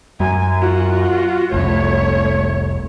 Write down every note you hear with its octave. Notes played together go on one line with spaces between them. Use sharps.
F#2 G#5
F4 F#4
F1 C2 A3 C#5